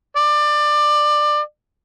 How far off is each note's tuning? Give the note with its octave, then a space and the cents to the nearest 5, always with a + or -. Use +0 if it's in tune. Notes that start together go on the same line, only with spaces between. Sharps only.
D5 +20